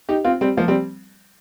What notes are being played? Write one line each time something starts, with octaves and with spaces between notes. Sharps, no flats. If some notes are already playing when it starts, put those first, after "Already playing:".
D#4 G4
C4 F4
G3 C4
F3 A#3
G3 C4